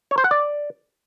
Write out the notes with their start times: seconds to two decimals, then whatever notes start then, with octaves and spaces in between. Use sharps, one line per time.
0.11 C#5
0.18 C5
0.24 F#5
0.31 D5